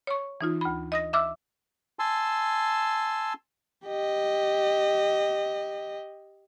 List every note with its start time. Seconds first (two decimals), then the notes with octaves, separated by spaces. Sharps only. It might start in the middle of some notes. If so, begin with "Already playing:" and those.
0.07 C#5 C#6
0.41 E3 D#4 F4
0.61 D2 B5
0.92 D#5 D#6 A#6
1.13 E5 D6 E6 F6
1.99 G#5 A5 C6 E6
3.86 G4 D#5